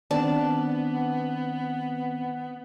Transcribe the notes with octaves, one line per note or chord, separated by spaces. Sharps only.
D#3 B3 C4 D4